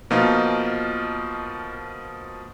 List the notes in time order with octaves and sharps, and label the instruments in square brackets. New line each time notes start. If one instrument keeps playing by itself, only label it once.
[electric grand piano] B2 F3 A#3 D#4 F4